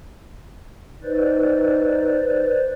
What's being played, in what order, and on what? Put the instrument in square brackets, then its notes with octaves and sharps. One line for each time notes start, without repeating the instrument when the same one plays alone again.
[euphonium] D#4 [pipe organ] B4 C5 D5